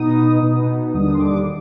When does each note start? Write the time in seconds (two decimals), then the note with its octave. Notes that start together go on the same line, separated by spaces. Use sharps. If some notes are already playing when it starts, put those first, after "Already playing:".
Already playing: B2 B3 D#4 D#6
0.42 B2 B3 D#4
0.94 D#2 D3 G3 D4 D#6
1.14 C6
1.20 D6